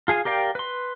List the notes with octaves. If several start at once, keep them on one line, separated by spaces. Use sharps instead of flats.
F4 G#4 F5 G#5
G4 A#4 D5 F5 G5
B4 C6